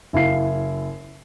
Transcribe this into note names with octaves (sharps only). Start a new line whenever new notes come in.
F#1 E4 F5 C7